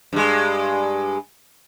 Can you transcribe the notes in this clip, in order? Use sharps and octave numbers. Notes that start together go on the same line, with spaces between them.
G2 G#3